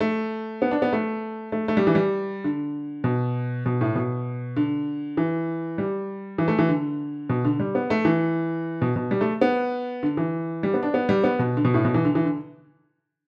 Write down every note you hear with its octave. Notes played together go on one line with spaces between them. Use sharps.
A3
B3
D4
B3
A3
A3
A3
G3
E3
G3
D3
B2
B2
A2
B2
D3
E3
G3
E3
A3
E3
D3
B2
D3
G3
B3
A3
E3
B2
B2
G3
A3
B3
D3
E3
G3
B3
D4
B3
G3
B3
B2
D3
B2
A2
B2
E3
D3
E3
D3